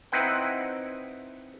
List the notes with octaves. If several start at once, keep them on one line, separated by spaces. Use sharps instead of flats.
C4 D#4 E4 B4 F#5 G5